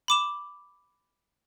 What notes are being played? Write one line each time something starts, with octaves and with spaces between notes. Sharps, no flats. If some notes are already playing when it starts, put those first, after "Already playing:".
B5 D6 E7